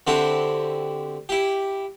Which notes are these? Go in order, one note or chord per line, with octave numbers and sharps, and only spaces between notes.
D3 C4 E4 F#4 G4
E4 G4